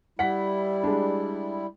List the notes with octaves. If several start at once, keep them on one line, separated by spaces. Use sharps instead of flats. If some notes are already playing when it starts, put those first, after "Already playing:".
G3 E4 F#5 B6
G#3 D4